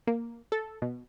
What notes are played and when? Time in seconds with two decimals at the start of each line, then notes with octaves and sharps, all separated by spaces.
0.07 A#3
0.52 A4
0.82 B2